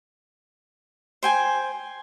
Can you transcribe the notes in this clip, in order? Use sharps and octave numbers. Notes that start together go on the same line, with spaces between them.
C5 G5 G#5